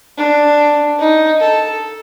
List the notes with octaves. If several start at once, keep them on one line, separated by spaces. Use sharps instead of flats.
D4
D#4
A4